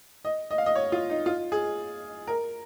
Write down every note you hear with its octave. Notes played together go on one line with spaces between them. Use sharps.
D#5
D#5
F5
D#5
C#5
F4
D#4
F4
G#4
A#4